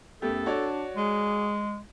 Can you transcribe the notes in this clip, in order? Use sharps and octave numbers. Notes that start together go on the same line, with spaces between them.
F#2 A3 B3 G4 A4
D4 F#4 C#5 D5
G#3 G#4